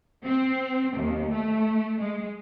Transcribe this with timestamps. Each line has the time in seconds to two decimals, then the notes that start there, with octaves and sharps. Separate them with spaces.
0.23 C4
0.97 D#2
1.30 A3
2.00 G#3